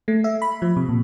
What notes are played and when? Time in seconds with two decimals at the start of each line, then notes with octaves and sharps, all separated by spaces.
0.08 A3
0.24 E5
0.42 B5
0.62 F3
0.76 C3
0.89 A#2